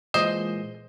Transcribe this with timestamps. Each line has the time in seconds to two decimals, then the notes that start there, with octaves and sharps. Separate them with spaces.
0.14 A#2 E3 G#3 C5 D#5